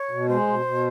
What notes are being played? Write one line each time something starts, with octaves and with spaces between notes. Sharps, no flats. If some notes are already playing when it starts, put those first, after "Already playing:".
Already playing: C#5
B2
G#3 C5
B2
B2